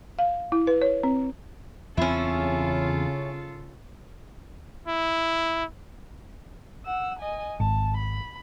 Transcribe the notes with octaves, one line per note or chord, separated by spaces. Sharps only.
F5
E4
B4
C#5
C4
E2 C#3 C4 C#4 E4 F4 A4
E4
F#5 E6
D#5 G#5
G#1 A5
B5